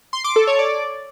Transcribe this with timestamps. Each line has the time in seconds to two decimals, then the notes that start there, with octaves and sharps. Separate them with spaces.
0.13 C6
0.24 D6
0.36 A4
0.47 C#5
0.59 D5